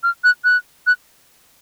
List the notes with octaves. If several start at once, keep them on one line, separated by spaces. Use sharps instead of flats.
F6
F#6
F#6
F#6